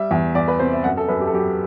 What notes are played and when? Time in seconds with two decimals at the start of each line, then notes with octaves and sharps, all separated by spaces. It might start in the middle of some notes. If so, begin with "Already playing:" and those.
Already playing: G3 E5
0.11 E2
0.35 E2 D5
0.48 B4
0.59 C3 C5
0.73 E5
0.84 F#2 F#5
0.97 A4
1.08 F#2 B4
1.21 G4
1.27 A4
1.33 F#3 G4